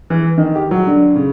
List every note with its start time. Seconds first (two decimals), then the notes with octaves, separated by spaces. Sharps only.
0.10 E3
0.38 D#3
0.55 G4
0.71 F#3
0.87 D3
1.15 C#3